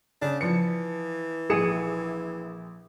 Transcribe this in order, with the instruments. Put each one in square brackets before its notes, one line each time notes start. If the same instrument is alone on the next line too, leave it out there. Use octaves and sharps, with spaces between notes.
[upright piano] C#3 [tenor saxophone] D4
[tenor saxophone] E3 [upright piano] F3 C#7
[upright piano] A#1 C#7 E7 [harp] G#4 D#7